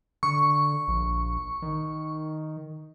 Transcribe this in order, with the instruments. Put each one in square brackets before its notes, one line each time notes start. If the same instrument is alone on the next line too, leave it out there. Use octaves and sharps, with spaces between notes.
[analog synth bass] D3 [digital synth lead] C#6
[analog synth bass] A#1
D#3